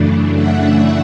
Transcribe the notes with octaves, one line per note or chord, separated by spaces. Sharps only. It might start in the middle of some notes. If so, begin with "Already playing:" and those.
Already playing: F#2 C#3 E3 A3 D4
E5 F#5